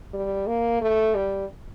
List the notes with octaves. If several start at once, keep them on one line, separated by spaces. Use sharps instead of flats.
G3
A#3
A3
G3